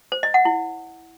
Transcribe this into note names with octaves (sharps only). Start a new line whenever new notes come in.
C5
D#5
F#5
E4